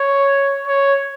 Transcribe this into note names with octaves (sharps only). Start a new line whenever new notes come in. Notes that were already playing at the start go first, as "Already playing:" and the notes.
Already playing: C#5
C#5